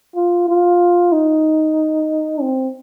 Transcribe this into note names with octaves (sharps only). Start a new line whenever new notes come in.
F4
F4
D#4
C4